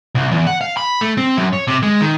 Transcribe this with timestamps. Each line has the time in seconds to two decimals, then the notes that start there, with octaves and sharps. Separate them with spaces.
0.15 C2
0.31 E2
0.47 F#5
0.61 F5
0.77 B5
1.01 A3
1.17 C4
1.37 F#2
1.53 C#5
1.67 C3
1.83 G#3
2.01 D#3